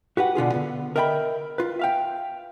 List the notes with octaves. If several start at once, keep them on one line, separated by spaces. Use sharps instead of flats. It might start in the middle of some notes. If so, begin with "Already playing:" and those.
F#4 G4 B4 F#5
B2 D3 F4 G#4
D3 B3
A#4 D#5 E5 G5 G#5 B5
F4 B4
E5 F5 G5